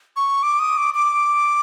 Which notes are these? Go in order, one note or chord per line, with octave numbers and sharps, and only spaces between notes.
C#6
D6
D#6
D6
D6